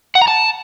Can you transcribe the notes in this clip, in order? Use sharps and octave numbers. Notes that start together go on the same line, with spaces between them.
F#5
A#5
A5